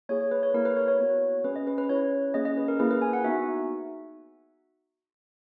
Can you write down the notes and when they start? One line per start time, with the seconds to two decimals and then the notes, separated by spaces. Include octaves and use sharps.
0.09 A#3 E4 G#4 C#5
0.21 C#5
0.31 B4
0.43 C#5
0.54 A#3 E4 G#4 A#4
0.65 B4
0.77 C#5
0.88 C#5
0.99 B3 F#4
1.44 C#4 G#4 B4
1.56 D#5
1.67 B4
1.78 B4
1.89 C#4 E4 G#4 C#5
2.34 A#3 C#4 G#4 D#5
2.45 D#5
2.57 B4
2.68 A#4
2.79 A#3 E4 G#4 B4
2.91 B4
3.02 G#5
3.13 F#5
3.24 B3 D#4 F#4 E5